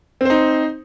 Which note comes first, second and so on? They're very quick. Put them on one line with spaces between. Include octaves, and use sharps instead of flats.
C4 C5 D#4